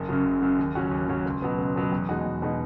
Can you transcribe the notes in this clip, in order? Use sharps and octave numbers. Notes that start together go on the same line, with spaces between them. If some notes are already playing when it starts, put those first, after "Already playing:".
Already playing: F#1
F#2 C#3 F#3
F#1
F#2 C#3 F#3
D#2
C#3 F#3 C#4 F#4
D#2
C#3 F#3 C#4 F#4
C#2
B2 F#3 B3
C#2
B2 F#3 B3
E2
B2 G#3 D#4 F#4
E2
B2 G#3 D#4 F#4